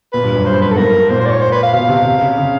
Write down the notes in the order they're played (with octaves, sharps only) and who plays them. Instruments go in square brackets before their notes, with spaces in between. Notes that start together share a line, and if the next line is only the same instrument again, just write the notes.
[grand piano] A#2 [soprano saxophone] B4
[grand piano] G2
F#2
[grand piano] G2 [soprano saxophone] C5
[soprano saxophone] B4
A4
[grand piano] G#2 [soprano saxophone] A#4
[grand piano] A#2 [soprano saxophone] C5
[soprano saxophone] C5
D5
C#5
C5
B4
F5
[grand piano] B2 [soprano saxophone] F5
[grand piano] C3
C3
C#3
C#3